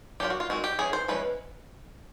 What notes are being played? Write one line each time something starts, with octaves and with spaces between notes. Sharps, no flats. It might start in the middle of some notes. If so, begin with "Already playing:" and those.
F#3 A#3 D4 F4 G4
F#4
F4
D#3 G#3 C4 F#4
G4
E3 G#3 C#4 E4 G#4
C5
F3 G#3 C#4 E4 B4